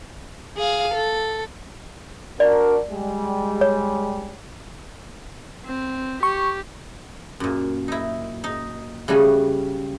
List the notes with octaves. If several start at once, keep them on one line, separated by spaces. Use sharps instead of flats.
G#4 F5
A4
D4 F#4 A#4 D5
G3 G#3
C#5
C4
G4 C#6
F#2 A#2
D#4 E4
D#4
C#3 G3 A3 F#4 G#5